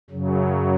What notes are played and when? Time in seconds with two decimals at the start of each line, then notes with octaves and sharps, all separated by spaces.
0.10 F#2 C#3 F#3